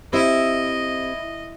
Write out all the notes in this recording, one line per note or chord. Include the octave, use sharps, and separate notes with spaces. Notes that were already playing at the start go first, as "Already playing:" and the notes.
C4 E4 G4 C5 D#5